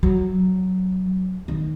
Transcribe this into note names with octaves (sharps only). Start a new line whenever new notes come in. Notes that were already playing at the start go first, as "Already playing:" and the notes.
F#3
D#3